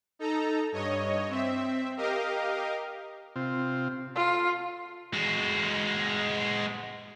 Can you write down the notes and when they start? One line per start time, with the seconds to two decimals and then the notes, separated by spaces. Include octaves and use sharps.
0.19 D#4 A4 A#5
0.72 G2 C#5 D#5
1.29 C4 E5
1.97 G4 A#4 D#5 F5
3.36 C3 C4 F4
4.16 F4 A4
5.13 G#3 F#4